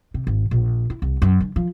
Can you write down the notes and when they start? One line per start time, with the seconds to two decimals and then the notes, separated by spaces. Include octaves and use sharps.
0.14 C3
0.27 G#1
0.51 A#1
0.90 E4
1.02 C2
1.22 F#2
1.40 D3
1.56 F3